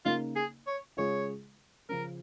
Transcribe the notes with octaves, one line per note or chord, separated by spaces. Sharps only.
C#3 A#3 D#4 F4
G#4
C#5
C#3 G#3 F4 G#4 C#5
C#3 F3 C#4 A#4